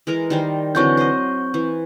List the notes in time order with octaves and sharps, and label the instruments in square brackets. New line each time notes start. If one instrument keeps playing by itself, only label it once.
[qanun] E3 G#3 A#4
D#3 G3 C5
[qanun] D3 E3 F#3 [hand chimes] C4 C#6 G6
[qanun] C5 D#5
E3